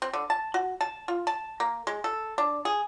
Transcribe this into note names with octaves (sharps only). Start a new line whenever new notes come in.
C4
D3
A5
F#4
A5
F4
A5
A#3
G#3
A4
D4
G#4